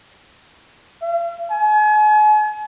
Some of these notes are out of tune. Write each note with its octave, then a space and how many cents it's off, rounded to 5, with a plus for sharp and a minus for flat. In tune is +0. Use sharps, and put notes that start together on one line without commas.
F5 -45
G#5 +40